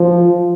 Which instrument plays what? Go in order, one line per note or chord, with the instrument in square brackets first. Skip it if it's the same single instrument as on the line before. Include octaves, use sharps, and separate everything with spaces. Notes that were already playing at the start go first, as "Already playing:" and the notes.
Already playing: [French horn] F3